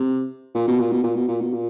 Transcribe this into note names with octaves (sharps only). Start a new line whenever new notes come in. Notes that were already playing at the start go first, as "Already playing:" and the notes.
Already playing: C3
A#2
B2
A#2
B2
A#2
B2
A#2
B2
A#2